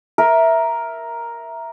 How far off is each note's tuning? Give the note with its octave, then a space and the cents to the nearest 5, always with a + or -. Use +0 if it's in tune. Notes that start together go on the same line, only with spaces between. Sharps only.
A#4 +5 E5 +0